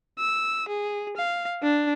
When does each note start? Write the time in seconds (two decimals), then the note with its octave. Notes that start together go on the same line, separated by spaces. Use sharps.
0.19 E6
0.69 G#4
1.17 F5
1.63 D4